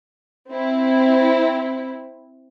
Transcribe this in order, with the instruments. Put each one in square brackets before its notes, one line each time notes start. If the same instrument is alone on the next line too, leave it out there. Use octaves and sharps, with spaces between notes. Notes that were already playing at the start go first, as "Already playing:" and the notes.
[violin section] C4 E4